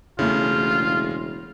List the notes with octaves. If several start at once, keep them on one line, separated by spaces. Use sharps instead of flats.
E1 C#3 A3 E4 F4